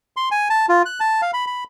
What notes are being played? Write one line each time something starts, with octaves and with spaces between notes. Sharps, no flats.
C6
G#5
A5
F4
F#6
A5
F5
B5
B5